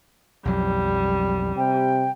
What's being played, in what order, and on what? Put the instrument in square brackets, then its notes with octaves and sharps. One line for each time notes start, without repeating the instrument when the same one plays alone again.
[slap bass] B1 F2 F#3 [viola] G3
[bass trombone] C3 [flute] G5